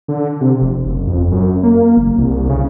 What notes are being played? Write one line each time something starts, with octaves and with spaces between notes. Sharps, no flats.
D3
C3
F1
F#1
F2
F#2
A#3
F#1
C2
C#3